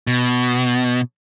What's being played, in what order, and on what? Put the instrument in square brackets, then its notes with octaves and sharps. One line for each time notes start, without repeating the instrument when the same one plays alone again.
[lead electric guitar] B2